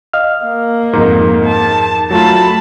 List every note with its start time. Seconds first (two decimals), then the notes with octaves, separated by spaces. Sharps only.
0.13 D#5 F5 F6
0.45 A#3
0.93 F2 G#2 D#4 A#4
1.45 A5
2.11 F#3 A3 F4 A5 B5